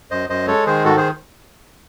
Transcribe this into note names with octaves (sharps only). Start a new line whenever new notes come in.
F#2 C5 D#5
F#2 C5 D#5
G#3 A4 C#5
D#3 G#4 C5
G#2 F#4 A4
G#4 C5